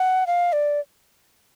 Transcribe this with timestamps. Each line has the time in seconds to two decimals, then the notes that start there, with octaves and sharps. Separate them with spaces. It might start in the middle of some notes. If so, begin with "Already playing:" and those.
Already playing: F#5
0.27 F5
0.53 D5